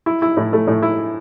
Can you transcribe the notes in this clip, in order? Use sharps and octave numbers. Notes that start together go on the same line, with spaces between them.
E4
E4
A2
A3
A2
E4